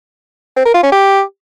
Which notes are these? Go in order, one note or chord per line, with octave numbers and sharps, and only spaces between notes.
C4
A#4
F4
C#4
G4